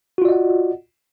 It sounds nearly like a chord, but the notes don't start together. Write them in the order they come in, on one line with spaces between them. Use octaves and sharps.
F#4 F4 D5 D#5 F#5